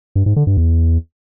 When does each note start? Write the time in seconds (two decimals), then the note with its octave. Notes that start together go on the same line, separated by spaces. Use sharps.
0.16 G2
0.26 G#2
0.36 D3
0.47 G2
0.57 E2